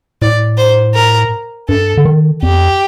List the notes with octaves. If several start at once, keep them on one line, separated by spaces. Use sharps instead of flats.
A2 D5
C5
A#4
G2 A4
D3
D#3
F2 G4